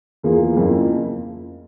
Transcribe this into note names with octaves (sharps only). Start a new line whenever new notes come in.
E2 E3 A#3 F4 G#4
F2 C#3 F3 A#3 E4